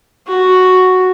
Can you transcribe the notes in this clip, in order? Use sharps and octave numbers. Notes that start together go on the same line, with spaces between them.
F#4